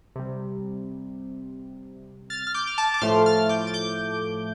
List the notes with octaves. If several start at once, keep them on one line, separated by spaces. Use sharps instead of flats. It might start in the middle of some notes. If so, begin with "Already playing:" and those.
C3 G3
F6 A6
F6
D6 G6
F6
A5 D6
D6
A2 F3 A3 C6 F6
F6 A6
D6 G6
A6
D6 G6